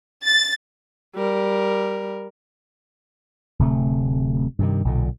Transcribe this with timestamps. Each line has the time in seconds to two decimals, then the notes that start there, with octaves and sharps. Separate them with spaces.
0.24 A6
1.16 G3 A#4
3.59 D1 C3 A3
4.59 G2 C3 D#3
4.85 B1 A#2 D3